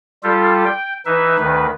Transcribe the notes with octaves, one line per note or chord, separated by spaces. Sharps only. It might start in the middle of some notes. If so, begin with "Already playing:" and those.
G3 F4 G4 A4
G5
E3 D#4 B4 E5
D2 D#3 B4